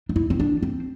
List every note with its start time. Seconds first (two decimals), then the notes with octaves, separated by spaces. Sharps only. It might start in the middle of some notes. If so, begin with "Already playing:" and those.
0.09 D4
0.16 E4
0.30 C4
0.40 D4
0.62 C4